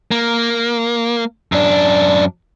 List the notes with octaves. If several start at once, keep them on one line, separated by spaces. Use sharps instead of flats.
A#3
F#2 D4